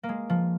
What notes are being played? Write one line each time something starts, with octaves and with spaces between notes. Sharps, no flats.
A#3
G#3
F3